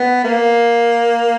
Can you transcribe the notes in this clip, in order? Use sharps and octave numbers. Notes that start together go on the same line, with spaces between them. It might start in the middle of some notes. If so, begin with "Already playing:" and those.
Already playing: B3
A#3